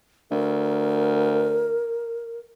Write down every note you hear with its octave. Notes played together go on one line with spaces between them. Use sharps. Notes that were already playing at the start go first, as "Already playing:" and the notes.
D2 A#4